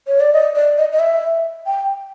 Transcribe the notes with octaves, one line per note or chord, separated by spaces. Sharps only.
C#5
D5
D#5
D5
D#5
D#5
E5
G5